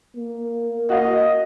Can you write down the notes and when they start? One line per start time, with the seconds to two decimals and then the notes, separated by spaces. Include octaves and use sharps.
0.17 A#3
0.90 F#4 D#5 F5